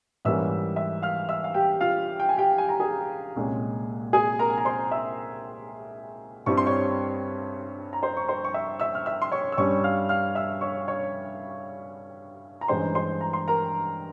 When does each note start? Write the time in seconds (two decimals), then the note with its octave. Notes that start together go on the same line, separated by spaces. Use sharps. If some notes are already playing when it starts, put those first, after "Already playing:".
0.25 G#2 E3 G3 A#3 C#4 E5 E6
0.76 E5 E6
1.02 F5 F6
1.29 E5 E6
1.44 F5
1.54 G4 G5
1.81 F4 F5
2.20 G5
2.29 G#5
2.38 G4 G5
2.58 G#5
2.69 A#5
2.80 G#4 G#5
3.36 C2 A#2 G#3 C#4
4.13 G#4 G#5
4.39 A#4 A#5
4.50 G#5
4.58 A#5
4.65 C5 C6
4.91 E5 E6
6.46 G2 G3 C4 E4 C#6
6.57 C6
6.66 C#5 C#6
7.93 A#5
8.03 C5 C6
8.17 C#6
8.28 C5 C6
8.44 C#6
8.54 E5 E6
8.80 E5 E6
8.95 F6
9.06 E5 E6
9.22 C6
9.32 C#5 C#6
9.52 E6
9.57 G2 G3 C#4 C#5 C#6
9.84 F5 F6
10.09 F5 F6
10.35 E5 E6
10.61 C#5 C#6
10.88 C#5 C#6
12.61 A#5
12.68 G2 E3 G#3 C#4 C5 C6
12.95 C5 C6
13.21 A#5
13.33 C6
13.48 A#4 A#5